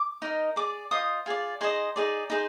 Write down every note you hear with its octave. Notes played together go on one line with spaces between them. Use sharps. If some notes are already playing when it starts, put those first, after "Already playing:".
Already playing: D6
D#4 A#4 D#5
G#4 D5 D6
F4 C5 D#5 D#6
F4 G#4 D5
D#4 G#4 C5 D#5 C6
D#4 G#4 D5
D#4 G#4 C5